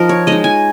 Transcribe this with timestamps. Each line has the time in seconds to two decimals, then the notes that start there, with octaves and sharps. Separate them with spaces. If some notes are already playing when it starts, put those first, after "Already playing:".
Already playing: F3 D#4 A#4 D#5
0.09 C#5
0.27 G#3 D#4 D#5
0.44 G#5